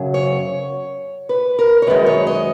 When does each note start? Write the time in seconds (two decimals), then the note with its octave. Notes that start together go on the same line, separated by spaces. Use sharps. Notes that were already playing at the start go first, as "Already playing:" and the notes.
Already playing: F#2 C#3 F#3
0.14 C#5
1.29 B4
1.59 A#4
1.82 C#5
1.87 F#2 D#3 G#3 B4
2.06 C#5
2.27 D#5